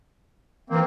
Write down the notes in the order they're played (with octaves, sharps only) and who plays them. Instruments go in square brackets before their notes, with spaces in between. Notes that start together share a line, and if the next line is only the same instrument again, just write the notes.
[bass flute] E3 [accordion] A#3 C4